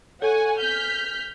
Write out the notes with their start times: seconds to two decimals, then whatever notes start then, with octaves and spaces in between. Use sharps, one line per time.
0.22 A4 C#5 F#5 G#5 C#6
0.57 F6 G6 B6